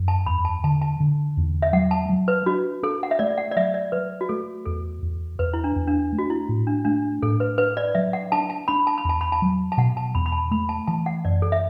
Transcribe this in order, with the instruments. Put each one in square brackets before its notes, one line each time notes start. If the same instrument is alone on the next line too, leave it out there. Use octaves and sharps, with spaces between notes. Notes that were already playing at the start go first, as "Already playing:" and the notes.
Already playing: [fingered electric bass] F#2
[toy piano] A5
[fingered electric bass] E2 [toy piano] B5
[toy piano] A5
[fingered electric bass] D3 [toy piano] A5
[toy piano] A5
[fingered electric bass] D3
E2
[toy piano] E5
[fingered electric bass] F#3 [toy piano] F#5
[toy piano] A5
[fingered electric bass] F#3
[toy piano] B4
[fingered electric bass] D4 [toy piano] F#4
[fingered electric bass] D4 [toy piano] A4
[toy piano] F#5
E5
[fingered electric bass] A3 [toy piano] D5
[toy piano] F#5
D5
[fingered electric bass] F#3 [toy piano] E5
[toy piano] D5
[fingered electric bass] F#3 [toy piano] B4
[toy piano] F#4
[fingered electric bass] A3 [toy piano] A4
[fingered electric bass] E2 [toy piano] A4
[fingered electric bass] E2
[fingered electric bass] E2 [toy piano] B4
[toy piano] E4
D4
[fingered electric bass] E2
[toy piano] D4
[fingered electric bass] A3
[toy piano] F#4
E4
[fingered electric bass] A2
[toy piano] D4
[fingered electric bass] A3 [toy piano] D4
[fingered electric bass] A2 [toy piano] A4
[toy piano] B4
[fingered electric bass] D4 [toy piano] B4
[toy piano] D5
[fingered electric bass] F#3 [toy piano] E5
[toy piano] F#5
[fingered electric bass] D4 [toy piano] A5
[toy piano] A5
[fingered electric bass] D4 [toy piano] B5
[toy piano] A5
B5
[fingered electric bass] E2 [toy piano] A5
[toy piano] B5
A5
[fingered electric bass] F#3
[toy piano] A5
[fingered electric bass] B2 [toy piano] F#5
[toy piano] A5
[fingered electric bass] E2 [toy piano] B5
[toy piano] B5
A5
[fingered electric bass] A3 [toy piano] B5
[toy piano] A5
[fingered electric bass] E3 [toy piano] A5
[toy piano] F#5
[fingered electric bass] F#2 [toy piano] D5
[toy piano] A4
E5